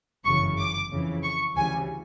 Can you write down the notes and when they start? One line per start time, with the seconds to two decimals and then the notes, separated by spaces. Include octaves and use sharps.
0.25 G1 F#2 C#3 E3 C#6
0.58 D6
0.91 F2 C#3 E3
1.23 C#6
1.56 D2 C#3 E3 G3 G#5